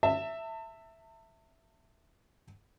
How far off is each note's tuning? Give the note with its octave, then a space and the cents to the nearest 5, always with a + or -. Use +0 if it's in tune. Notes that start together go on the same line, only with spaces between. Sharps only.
E5 +0 A5 +40